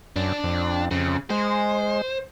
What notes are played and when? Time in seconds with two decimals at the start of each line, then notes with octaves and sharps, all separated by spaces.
0.16 F#2 D4
0.44 F2
0.91 F2 C#3
1.30 G#3 C5